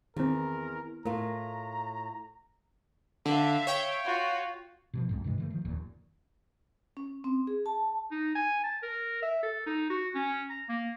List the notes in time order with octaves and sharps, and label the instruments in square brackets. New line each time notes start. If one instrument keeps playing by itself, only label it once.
[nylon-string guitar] E2 [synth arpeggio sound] D#3 C4 [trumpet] A#4
[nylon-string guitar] A2 F4 [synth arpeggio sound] A3 A#4 [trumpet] A#5
[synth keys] D3 [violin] E5 F5
[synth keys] C#5 G5
[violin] F4 F#4
[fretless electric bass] B2 D#3 F3
C2 F2 G#2
G2 C3 E3 G#3
D3 E3 A3
D#3 F3
F1 D#2 A#2
[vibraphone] C#4
C4
G#4
A5
[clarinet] D#4
G#5
A5
A#4
E5
A4
D#4
F#4
C#4
A#5
A#3